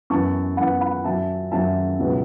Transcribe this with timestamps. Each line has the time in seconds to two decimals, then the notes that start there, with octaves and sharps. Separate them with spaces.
0.10 F#2 E3 B3 A5 C#6
0.57 F#2 E3 B3 F#5 B5
0.81 F#5 B5
1.04 F#2 F#3 C#4 E5 A5
1.51 F#2 F#3 C#4 E5 A5
1.99 C#2 B2 F#3 B3